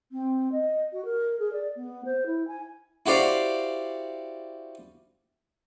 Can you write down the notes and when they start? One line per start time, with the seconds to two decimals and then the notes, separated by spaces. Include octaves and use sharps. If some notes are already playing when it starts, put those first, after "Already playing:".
0.12 C4
0.52 D#5
0.93 F#4
1.05 A#4
1.39 G#4
1.53 D5
1.76 B3
2.05 C5
2.26 E4
2.47 G#5
3.06 E4 F#4 G4 C5 D5 F5